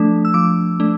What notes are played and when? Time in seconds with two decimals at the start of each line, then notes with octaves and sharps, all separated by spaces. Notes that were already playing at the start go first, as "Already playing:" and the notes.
Already playing: F3 A3 D4
0.25 E6
0.34 F3 D6
0.80 A3 D4